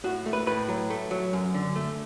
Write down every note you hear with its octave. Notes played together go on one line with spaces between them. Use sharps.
A2 F#4
A3
B4
A2 B4
F#3
A3
F#3
F#2
D3
A3